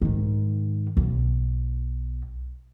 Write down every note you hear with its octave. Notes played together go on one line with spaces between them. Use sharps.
G#2 D#3
B1